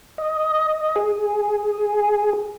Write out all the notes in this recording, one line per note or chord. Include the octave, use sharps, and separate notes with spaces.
D#5
G#4